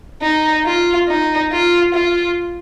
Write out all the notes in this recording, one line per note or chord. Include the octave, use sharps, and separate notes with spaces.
D#4
F4
D#4
F4
F4